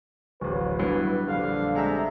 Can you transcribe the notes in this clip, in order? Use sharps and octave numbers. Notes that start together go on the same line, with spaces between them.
D1 A1 B4
G2 F#3 B3 E4
A#1 D3 G3 F5
C3 G#3 E5 A#5